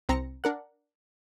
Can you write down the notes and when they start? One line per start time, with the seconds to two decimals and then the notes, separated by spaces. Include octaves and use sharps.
0.09 C2 C4 A#5 A#6 C#7
0.44 D4 A#4 F#5